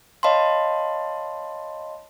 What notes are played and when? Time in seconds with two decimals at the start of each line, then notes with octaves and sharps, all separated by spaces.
0.23 C#5 D#5 F5 A5 B5 C6